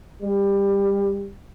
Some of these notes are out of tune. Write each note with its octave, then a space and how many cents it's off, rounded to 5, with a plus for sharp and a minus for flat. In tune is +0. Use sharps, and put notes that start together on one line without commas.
G3 +20